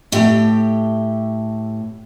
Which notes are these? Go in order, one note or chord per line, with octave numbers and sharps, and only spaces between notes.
A2 A3 G4 G5